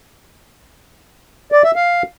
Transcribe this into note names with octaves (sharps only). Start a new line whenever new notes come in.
D5
E5
F5